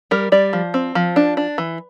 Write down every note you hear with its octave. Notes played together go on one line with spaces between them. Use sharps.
G3 A#4
G3 D5
F3
C4
F3
D4
D4
E3